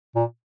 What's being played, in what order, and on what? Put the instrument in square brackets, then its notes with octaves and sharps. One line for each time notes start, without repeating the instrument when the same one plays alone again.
[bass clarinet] A#2